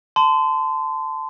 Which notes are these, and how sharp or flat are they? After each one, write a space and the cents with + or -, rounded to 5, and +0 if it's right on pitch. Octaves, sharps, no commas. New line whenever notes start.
A5 +0 C6 -30